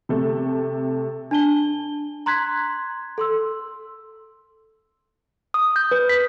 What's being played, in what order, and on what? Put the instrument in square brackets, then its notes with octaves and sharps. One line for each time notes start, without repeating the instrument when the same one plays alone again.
[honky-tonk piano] C3 A3
[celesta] D4 A5 G7
A#5 C6 F#6 G#6 B6
A4 C6 E6
[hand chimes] D#6
G6
B4
B6